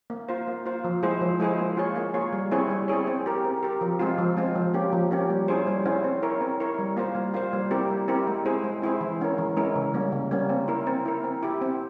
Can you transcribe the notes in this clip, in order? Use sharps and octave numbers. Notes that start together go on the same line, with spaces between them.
A#3
F4 C5
A#3
F4 C5
F3
G#3 E4 G#4 C5
F3
G#3 E4 G#4 C5
A#3
F4 G#4 C#5
A#3
F4 G#4 C#5
G3
C4 E4 G#4 C#5
G3
C4 E4 G#4 C#5
C4
G4 A#4
C4
G4 A#4
F3
G#3 C4 F4
F3
G#3 C4 F4
F3
A#3 C#4 G4
F3
A#3 C#4 G4
G3
C#4 E4 G#4 C5
G3
C#4 E4 G#4 C5
C4
E4 A#4 C#5
C4
E4 A#4 C#5
G3
A#3 F4 C5
G3
A#3 F4 C5
G3
C4 E4 G4 A#4
G3
C4 E4 G4 A#4
G#3
C4 E4 G#4 C5
G#3
C4 E4 G#4 C5
E3
G#3 C#4 E4 A#4
E3
G#3 C#4 E4 A#4
C#3
G3 A#3 C#4
C#3
G3 A#3 C#4
C4
E4 A#4
C4
E4 A#4
C4
E4 G4
C4